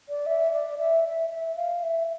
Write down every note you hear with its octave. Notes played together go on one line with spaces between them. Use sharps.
D5
E5
D5
E5
E5
E5
F5
E5